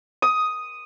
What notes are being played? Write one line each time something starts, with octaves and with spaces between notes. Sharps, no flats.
D#6